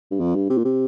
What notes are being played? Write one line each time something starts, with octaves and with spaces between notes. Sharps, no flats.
G2
F2
G2
C3
A#2
C3